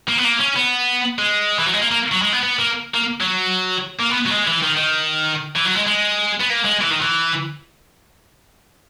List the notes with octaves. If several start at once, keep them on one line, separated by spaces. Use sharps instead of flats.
A#3
B3
A#3
C#4
B3
G#3
E3
F#3
G#3
A#3
A#3
F#3
G#3
B3
B3
A#3
A#3
F#3
A#3
B3
F#3
G#3
E3
D#3
D#3
E3
F#3
G#3
G#3
B3
A#3
G#3
E3
D#3
E3